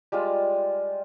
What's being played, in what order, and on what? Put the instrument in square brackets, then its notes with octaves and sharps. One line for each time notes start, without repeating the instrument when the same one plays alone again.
[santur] G3 G#3 F4